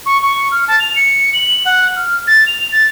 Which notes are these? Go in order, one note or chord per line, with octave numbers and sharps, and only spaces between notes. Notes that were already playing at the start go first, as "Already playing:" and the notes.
C#6
C#6
F6
A5
F7
C#7
F#7
F#5
F6
A6
F7
A6